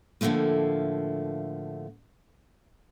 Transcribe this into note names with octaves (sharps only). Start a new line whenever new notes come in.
A2 D3 E3 F3 A3 A#3